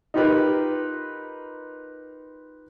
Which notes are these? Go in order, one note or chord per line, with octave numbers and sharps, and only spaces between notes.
D#4 F4 G4 A#4 B4